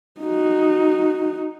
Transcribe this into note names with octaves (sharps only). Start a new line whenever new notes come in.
D#4 F#4